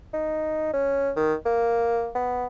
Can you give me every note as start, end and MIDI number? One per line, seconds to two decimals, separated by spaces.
0.14 0.73 63
0.73 1.11 61
1.16 1.34 51
1.46 2.09 58
2.15 2.47 59